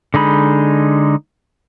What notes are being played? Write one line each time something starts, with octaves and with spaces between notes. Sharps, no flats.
D3 G#3 D#4 B5